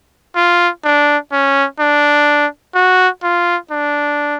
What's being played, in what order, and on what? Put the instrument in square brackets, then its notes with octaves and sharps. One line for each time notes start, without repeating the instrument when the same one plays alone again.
[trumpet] F4
D4
C#4
D4
F#4
F4
D4